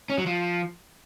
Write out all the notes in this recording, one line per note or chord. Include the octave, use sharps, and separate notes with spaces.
C#4
F#3
F3